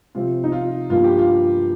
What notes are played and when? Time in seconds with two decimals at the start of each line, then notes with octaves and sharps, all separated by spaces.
0.15 C3 F3 C4 F4
0.44 D#4
0.52 F4
0.90 G2 F3 A#3 F4
1.04 G4
1.19 F4